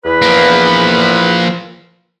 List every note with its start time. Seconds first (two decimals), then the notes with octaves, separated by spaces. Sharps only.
0.05 E2 B4
0.22 F3 A#3